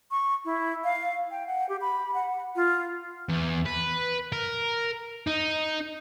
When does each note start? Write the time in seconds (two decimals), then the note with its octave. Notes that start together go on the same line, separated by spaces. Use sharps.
0.11 C#6
0.45 E4
0.84 F5
1.31 G5
1.47 F#5
1.69 G4
1.81 B5
2.14 F#5
2.56 F4
3.29 E2
3.66 B4
4.32 A#4
5.27 D#4